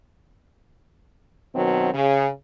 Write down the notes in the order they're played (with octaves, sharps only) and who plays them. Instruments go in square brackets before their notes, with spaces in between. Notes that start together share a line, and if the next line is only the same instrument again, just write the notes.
[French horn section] F#2 B2 D#3 F#3 C4
C#3